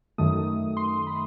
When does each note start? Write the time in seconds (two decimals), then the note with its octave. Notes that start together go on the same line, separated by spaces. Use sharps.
0.18 F#2 D#3 A3 D#6
0.77 C6
1.07 B5